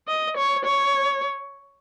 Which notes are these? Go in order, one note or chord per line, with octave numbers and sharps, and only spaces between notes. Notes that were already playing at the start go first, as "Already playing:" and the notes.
D#5
C#5
C#5